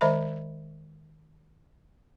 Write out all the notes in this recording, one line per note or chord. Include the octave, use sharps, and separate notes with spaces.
D#3 G#3 C5 D#5 E5 B5